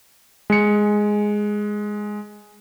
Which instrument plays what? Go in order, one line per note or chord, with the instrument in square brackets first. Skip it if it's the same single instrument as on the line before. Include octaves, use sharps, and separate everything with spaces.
[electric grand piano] G#3 C#7